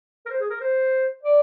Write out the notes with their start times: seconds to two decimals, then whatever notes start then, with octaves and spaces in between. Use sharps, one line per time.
0.26 A#4
0.30 C5
0.40 G#4
0.50 A#4
0.61 C5
1.23 D5